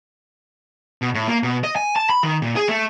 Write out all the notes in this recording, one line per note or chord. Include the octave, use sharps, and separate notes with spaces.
B2
A2
A#3
B2
D#5
G#5
A5
B5
D#3
A#2
G#4
A3